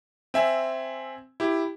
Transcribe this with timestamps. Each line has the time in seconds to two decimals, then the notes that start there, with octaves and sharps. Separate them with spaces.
0.34 C4 E5 G#5
1.40 E4 G4